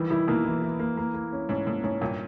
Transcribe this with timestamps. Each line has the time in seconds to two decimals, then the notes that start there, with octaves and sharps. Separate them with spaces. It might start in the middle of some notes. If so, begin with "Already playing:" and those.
Already playing: D#3 E3 G3
0.10 D#3 G3 E4
0.27 B2 D#3 A#3
0.45 E3
0.62 E3
0.79 A#3
0.97 A#3
1.14 A#3
1.33 C#4
1.49 G#2 C#4
1.67 G#2 A#3
1.84 G#2 C#4
2.01 G2 A#2 C#4